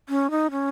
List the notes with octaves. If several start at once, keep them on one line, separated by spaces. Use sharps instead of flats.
C#4
D#4
C#4